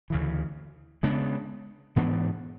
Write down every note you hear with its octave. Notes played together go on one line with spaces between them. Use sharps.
D2 C#3 E3
C#3 G#3 B3 D4
G#2 E3 B3 D4